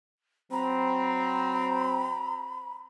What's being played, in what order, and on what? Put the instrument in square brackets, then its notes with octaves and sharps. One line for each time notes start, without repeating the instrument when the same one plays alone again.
[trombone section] F#3 C4 [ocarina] A#5 [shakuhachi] B5